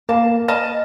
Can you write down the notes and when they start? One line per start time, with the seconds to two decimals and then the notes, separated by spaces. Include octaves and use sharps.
0.09 A#3 A5
0.48 D#5 A5 F6